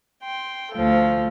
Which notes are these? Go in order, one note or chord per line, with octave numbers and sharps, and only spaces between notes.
G5 C6
D2 F3 A4